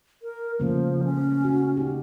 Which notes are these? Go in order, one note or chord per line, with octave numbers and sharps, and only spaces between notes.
A#4
C#3 F3 A3 A#3
C#4
F#4
D#4 G4